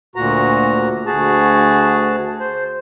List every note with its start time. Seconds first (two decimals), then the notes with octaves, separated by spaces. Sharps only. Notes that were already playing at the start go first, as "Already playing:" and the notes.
0.16 D2 A#2 F#4 A#5
1.06 D2 F#4 G#4 A5
2.40 C5